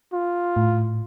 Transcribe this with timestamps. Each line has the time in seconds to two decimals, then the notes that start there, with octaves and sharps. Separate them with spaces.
0.13 F4
0.56 A2